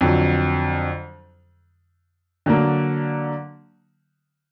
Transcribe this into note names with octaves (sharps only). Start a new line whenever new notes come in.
F2 D3 F#3
D3 F#3 A#3